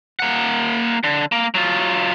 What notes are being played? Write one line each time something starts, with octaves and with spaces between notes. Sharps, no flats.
A#3 F#5
D3
A#3
F#3 F4